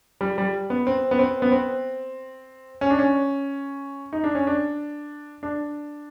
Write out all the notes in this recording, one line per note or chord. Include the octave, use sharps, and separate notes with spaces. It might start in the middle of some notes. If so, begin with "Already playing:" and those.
G3
G3
B3
C4
B3
C4
B3
C4
C#4
D4
C#4
D#4
D4
C#4
D4
D4